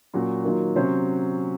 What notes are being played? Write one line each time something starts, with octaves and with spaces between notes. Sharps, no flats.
A#2 F#3 C#4 F#4
D#3 F#3 A#3 F4
C3 F#3 C#4 F#4 C5